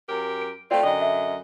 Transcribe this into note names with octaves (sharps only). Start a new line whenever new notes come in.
F#2 G4 A#4
D7
A3 C4 F4 D5 G5
F#2 D3 D#5
E5